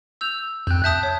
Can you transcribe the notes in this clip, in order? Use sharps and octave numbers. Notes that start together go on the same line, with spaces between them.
E6 G6 F7
F2 G5 F#6 G6
E5 A5 D#6 G6
C#5